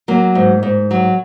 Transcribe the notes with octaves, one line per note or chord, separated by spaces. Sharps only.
F#3 A#3
G#2
G#2
F#3